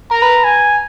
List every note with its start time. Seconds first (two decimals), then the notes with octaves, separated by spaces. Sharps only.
0.11 A#4 A#5
0.22 B4
0.44 G#5